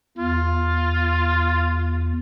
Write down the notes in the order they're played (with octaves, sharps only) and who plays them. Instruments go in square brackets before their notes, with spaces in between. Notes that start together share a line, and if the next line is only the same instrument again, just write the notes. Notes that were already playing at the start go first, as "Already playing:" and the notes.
[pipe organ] E2 [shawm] F4